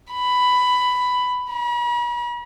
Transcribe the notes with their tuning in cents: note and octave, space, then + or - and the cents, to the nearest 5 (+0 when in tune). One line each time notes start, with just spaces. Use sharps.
B5 +10
B5 -45